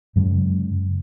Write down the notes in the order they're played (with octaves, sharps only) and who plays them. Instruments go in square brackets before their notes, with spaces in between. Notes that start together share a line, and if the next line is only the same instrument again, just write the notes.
[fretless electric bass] F#2 C#3 F#3 G#3